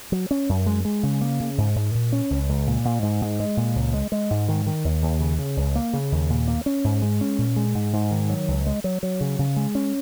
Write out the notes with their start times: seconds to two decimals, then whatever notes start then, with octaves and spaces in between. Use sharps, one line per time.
0.12 F#3
0.31 C#4
0.49 F#2
0.66 G#3
0.85 G#3
1.03 C#3
1.21 A#3
1.40 C#3
1.58 G#2
1.76 G#2
1.95 A#2
2.12 C#4
2.30 C#2
2.49 C#2
2.67 A#2
2.85 A#2
3.02 G#2
3.21 G#2
3.40 G#3
3.57 A#2
3.76 C#2
3.94 G#3
4.12 G#3
4.31 G#2
4.49 D#3
4.67 D#3
4.85 D#2
5.02 D#2
5.20 C#3
5.39 C#3
5.57 C#2
5.75 A#3
5.93 C#3
6.12 D#2
6.30 A#2
6.48 A#3
6.66 C#4
6.84 G#2
7.02 G#3
7.21 C#4
7.38 A#2
7.56 G#3
7.75 G#2
7.93 G#2
8.11 D#3
8.29 F#3
8.48 C#2
8.67 G#3
8.84 F#3
9.03 F#3
9.21 C#3
9.39 C#3
9.56 G#3
9.75 C#4